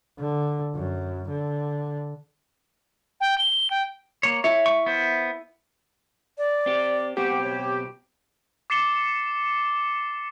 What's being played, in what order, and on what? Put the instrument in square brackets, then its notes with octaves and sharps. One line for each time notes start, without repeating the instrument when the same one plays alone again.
[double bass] D3
F#2
D3
[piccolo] G5
G7
G5
[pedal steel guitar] A#3 C#5
[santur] E4 E5 [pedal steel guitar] C#5
[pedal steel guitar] C#6
B3 C5
[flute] D5
[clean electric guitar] C4 G4
[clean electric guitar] B1 B2 C4 [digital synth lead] G4 [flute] F#5
[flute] C#5
[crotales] D6 A6 C7 C#7 E7 G7